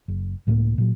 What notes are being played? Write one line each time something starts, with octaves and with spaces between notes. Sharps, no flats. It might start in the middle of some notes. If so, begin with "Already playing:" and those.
F#1
C#2 A2 F#3 A#3
A#2 F#3